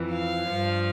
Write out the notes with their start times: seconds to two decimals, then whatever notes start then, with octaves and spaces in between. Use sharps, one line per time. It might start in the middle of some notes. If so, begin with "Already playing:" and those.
Already playing: F2 E3
0.12 F5
0.48 G2 F3